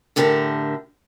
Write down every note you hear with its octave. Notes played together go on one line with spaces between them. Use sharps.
A2 D3 G4 A#4 C5 A5